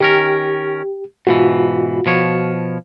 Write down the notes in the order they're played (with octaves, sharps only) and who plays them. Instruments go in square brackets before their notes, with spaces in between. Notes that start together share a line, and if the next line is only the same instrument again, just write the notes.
[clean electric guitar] D#3 C#4 A#4 [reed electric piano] G4
[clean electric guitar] G#2 B2 E3 [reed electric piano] F4 F#4
[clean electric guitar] B2 F3 C#5